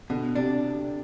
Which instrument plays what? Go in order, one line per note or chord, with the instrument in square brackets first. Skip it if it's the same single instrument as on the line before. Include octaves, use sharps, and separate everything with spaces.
[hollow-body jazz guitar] B2 [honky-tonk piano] D3
[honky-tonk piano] C3 [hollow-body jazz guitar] D4